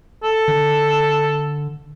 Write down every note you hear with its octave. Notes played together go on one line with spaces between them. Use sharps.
A4
D3